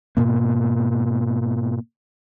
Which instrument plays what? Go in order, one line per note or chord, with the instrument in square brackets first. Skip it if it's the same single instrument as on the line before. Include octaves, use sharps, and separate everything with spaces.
[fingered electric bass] G#2 B2 A#3